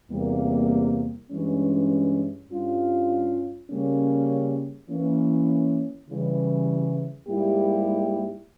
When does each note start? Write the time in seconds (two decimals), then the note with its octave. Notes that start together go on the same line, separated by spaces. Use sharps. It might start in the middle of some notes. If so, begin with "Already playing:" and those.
0.11 E2 C3 G3 A#3
1.31 G2 E3 G#3 C#4
2.50 G2 G3 C#4 F4
3.69 C#3 G3 A#3 C#4
4.89 E3 A#3 C#4
6.09 C#3 E3 G3
7.28 G#2 G3 A#3 E4 G4